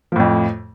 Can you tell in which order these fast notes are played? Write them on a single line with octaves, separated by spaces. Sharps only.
F3 A2 F2